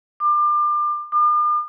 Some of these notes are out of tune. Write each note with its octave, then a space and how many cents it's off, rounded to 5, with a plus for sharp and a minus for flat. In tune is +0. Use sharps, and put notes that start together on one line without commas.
D6 +30
D6 +45